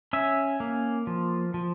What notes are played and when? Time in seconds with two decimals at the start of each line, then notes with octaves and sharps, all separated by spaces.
0.13 C#4 E5
0.60 A#3
1.07 F3
1.54 F3